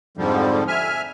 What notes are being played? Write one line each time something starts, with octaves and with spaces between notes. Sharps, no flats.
F2 G#2 D3 F3 G3
E5 G#5 F6